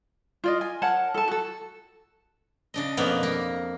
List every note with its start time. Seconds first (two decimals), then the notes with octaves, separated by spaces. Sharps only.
0.44 F4 D5 D#5
0.61 G#5
0.82 A#4 C#5 F#5 A5
1.14 A4 A5
1.28 F#4 A4
2.74 C#3 D4 D#5
2.97 F2 B2 A#3 B3
3.23 A#3